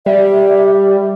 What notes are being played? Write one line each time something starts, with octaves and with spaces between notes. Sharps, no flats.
G3 E5